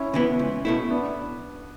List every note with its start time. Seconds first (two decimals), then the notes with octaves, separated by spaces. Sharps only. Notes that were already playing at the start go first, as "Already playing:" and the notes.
Already playing: C#4 E4
0.14 C#3 E3 B3
0.39 C#2
0.65 B2 A3 E4
0.90 B3 D4